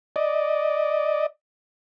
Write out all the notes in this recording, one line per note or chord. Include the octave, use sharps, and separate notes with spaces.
D5 D#5